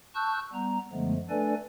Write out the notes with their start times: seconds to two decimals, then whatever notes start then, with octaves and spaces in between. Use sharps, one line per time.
0.15 A5 C#6 E6 F#6 G6
0.53 G3 B3 A#5
0.93 F#2 D3 F3 G#3 A3 B3
1.30 A3 D4 A4 B4 D5 G#5